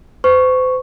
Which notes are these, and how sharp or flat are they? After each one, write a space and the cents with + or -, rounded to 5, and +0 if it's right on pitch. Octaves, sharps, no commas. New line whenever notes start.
C5 -40 C#6 +0